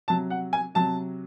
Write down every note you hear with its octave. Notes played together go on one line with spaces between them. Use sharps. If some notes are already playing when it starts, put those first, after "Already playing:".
C3 F#3 A5
F#5
G#5
C3 F#3 A5